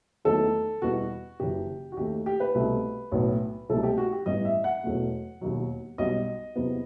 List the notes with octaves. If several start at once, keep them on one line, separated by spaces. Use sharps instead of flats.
E2 D#3 F#3 A3 A4
E2 B2 G3 B3 F#4
F#1 F#2 E3 G4
F#4
D#2 D#3 A3 G4
G4
B4
C2 B2 A3
B1 A2 F#3 B3
C2 B2 F#3 A3 A4
G4
F#4
G4
A1 G2 E3 G3 B3 D#5
E5
F#5
E1 E2 B2 F#3 A3
E1 D#2 D#3 F#3
B1 B2 G3 D#5
E2 C3 F#3 B3